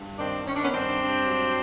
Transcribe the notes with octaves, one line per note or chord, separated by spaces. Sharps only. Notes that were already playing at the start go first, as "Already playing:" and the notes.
Already playing: G2
D#3 C4 D4
D#3 C#4
D4
B3 C#4
G2 C4 D4
G2
F#3